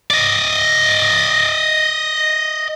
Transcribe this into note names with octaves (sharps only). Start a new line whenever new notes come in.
D5 D#5